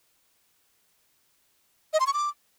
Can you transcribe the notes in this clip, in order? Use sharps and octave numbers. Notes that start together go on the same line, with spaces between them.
D#5
C6
C#6
D6